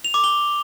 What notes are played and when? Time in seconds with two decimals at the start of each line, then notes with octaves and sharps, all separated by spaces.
0.05 F7
0.14 D6
0.24 G7